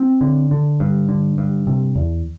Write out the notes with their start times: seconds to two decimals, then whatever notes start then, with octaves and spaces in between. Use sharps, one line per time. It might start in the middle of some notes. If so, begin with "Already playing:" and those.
Already playing: C4
0.21 D3
0.51 D3
0.80 G2
1.09 D3
1.38 G2
1.67 C3
1.95 E2